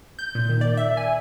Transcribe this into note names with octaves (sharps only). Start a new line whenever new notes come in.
G6
A#2
D#3
D5
E5
G#5